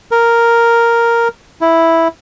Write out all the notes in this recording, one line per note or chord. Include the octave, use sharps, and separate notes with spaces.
A#4
E4